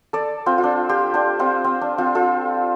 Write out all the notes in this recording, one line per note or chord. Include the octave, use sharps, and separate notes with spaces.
A4 D5
C4 F4
F4
D4
G4 C5
D4 G4
C4 F4
C4
D4
C4 F4
F4 A4